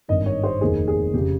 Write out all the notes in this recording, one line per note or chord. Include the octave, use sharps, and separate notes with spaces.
G#1 G2 D#3 D#5
C#5
C5
F1 D#2 D#3 G#4
G#4
F1 C#3 G4